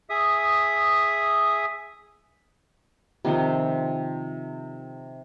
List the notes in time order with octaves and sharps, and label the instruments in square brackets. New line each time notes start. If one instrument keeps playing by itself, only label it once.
[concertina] G#4 E5 D#6
[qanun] C3 D#3 F3 C4